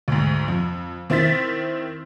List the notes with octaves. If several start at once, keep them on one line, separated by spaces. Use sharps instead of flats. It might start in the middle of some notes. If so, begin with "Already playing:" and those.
D2 G#2
F2
D#3 C4 E4 C5 A6 B6